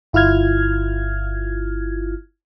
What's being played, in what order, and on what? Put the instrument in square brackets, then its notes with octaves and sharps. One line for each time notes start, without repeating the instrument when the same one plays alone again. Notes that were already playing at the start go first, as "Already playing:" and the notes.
[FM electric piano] G1 E4 F4 F6 G#6